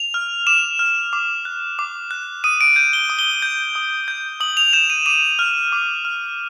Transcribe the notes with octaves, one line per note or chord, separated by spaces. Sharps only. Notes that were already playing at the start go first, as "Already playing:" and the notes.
Already playing: F7
F6
D6 E7
F6
D6
F#6
D6
F#6
D#6 D#7
D7
G6 D#7
G7
D#6
G7
G6
D#6
G6
D#6 F#7
F7
G6 E7
D#7
D6 D#7
F6
D6
F6